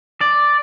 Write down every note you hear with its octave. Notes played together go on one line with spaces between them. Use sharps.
D5